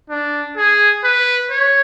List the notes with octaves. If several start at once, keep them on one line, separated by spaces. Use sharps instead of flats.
D4
G#4
B4
C#5